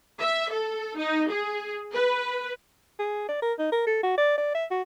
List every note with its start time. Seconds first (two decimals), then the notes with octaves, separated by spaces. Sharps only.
0.20 E5
0.51 A4
0.98 D#4
1.30 G#4
1.94 B4
2.99 G#4
3.28 D5
3.42 A#4
3.59 D#4
3.72 A#4
3.86 A4
4.03 F#4
4.17 D5
4.38 D5
4.54 E5
4.71 F#4